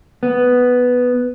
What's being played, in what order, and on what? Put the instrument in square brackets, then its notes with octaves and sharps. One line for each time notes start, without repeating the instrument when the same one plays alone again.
[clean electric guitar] B3